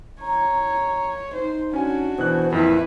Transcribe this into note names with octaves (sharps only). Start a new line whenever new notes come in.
C#5 A#5
D#4 C5
C#4 D4 F#4 G#5
B2 E3 C5 F#6
F2 A#2 C4 E4 B4